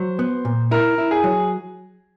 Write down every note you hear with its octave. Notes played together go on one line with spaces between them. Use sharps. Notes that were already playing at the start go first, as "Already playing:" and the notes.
Already playing: F#3 C5
B3
A#2
E4 A#4
E4
G#4
F#3